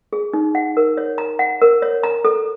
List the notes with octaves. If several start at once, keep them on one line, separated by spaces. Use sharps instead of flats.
G#4
D#4
F#5
A#4
C#5
A#5
F#5
A#4
C#5
A#5
A4